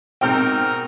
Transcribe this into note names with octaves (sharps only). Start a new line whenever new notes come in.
G#2 B2 C4 D#4 A#4 G5 F6 G6